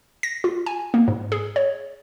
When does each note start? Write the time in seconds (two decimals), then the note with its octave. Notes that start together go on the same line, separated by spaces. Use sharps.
0.23 A#6
0.44 F4
0.66 G#5
0.94 A#3
1.08 G#2
1.32 G#4
1.56 C#5